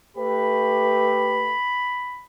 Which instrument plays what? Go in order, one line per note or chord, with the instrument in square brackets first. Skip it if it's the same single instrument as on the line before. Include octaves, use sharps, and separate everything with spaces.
[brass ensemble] A3 G4 B4 [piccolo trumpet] B5